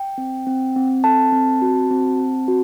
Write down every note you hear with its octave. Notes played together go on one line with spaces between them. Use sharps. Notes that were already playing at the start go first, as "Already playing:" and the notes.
Already playing: G5
C4
C4
C4
A4 A5
C4
F#4
C4
C4
F#4